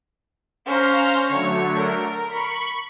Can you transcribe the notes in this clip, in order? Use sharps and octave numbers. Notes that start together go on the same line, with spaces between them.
C#4 C5 F5 A#5
D3 F#3 A3 C#5
A#4
B5 C#6